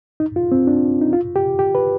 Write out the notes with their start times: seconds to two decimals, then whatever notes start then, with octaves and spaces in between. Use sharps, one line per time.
0.20 D#4
0.36 F4
0.52 C4
0.67 D4
1.02 D#4
1.13 F4
1.36 G4
1.59 G4
1.75 B4